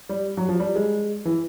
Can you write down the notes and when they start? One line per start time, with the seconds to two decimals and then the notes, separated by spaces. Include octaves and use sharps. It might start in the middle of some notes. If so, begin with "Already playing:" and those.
0.09 G3
0.37 F#3
0.49 F3
0.59 G3
0.76 G#3
1.25 E3